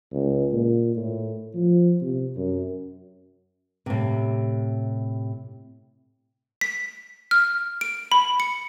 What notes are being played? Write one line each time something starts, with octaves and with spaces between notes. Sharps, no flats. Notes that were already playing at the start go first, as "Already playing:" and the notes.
C#2
A#2
A2
F3
C3
F#2
A2 C3
B6
F6
D7
B5
C#7